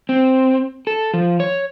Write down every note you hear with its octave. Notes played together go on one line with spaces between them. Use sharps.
C4
A4
F3
C#5